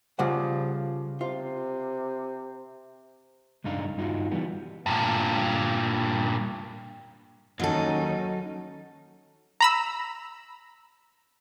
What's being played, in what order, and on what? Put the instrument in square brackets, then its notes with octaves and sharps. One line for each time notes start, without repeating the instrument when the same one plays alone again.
[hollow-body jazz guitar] C#3 G3 F#5 [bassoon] F3
[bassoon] C3 [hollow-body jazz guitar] F4
[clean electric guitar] C#2 G2 D4 D#4 F5
G2 D#4 F4 F#4
E3 G3 B3
[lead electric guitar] G2 A#2
[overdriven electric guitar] D#2 [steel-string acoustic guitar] F#3 A4 [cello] C#4 D#4
[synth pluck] A#5 B5 E6